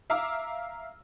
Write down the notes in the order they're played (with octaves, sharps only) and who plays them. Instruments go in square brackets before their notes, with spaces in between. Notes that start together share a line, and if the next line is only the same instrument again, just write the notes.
[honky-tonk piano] E5 F5 A#5 D6 E6 F6